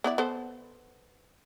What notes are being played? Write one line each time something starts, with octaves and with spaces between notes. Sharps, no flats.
B3 E4 D5
B3 A4 C5